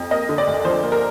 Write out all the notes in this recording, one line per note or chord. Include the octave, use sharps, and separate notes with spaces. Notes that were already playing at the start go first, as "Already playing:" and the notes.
Already playing: F2
A#3 D#5
D3
D5
D2
F3 C5
A#3
A#4